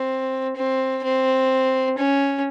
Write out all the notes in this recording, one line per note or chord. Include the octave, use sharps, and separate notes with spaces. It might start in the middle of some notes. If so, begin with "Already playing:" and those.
Already playing: C4
C4
C4
C#4